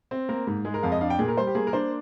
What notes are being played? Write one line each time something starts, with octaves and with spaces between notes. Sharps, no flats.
C4
A#3 A#4
G#2
G#3 G#4
A#4
F2 F5
D#5
D4 F5
G5
A#2 G#4
A#4
G3 C5
G4
A#3 G#4
A#4
D4 C5